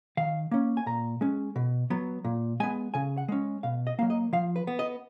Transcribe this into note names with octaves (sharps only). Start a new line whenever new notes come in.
D#3 F5
A#3 C#4
G#5
A#2 A#5
G#3 C#4
B2
F#3 B3
A#2
G#3 B3 G#5
C#3 G#5
F#5
G#3 C#4
B2 F5
D#5
F#3 A#3 F5
D#5
F3 F5
B4
B3
D#5